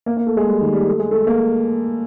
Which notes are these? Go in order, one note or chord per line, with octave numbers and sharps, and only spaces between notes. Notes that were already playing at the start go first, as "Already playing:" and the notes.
A#3
A#3
A3
G#3
G3
D#3
G3
A3
G#3
A3
A#3